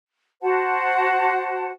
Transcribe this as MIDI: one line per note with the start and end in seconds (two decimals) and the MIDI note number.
0.41 1.70 66
0.41 1.70 72
0.41 1.70 78
0.41 1.70 81